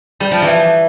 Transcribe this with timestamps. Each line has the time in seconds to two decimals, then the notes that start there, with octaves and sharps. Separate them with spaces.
0.20 G3
0.31 F3
0.42 E3